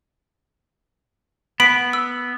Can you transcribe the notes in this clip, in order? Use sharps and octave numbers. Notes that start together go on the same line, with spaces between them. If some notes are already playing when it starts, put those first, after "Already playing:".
B3 B5 B6 D7
E6